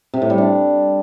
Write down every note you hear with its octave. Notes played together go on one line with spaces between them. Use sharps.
C3
A2
G3
D4